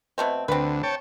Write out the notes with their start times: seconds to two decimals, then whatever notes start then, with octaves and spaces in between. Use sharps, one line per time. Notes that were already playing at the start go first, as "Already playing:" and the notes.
0.18 B2 A3 C4
0.48 D2 C4 B4
0.83 C#5 G5 A5